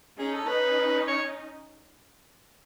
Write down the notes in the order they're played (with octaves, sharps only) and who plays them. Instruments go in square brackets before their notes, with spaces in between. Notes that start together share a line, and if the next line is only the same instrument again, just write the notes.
[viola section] C#4 D#4 [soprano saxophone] G#4
[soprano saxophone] A4
[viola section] C#4 D#4 [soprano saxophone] B4
[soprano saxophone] C#5